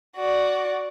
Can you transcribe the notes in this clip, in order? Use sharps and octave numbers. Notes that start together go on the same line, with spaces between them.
F#4 D5